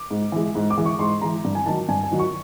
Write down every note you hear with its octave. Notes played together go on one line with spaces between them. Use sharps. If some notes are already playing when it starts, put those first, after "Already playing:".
Already playing: D6
G#2
E3 G#3
G#2
D6
E3 G#3
C#6
G#2 C6
E3 G#3 A#5
G2
G#5
D#3 F#3 A5
G2 G#5
G#5
D#3 F#3
C#6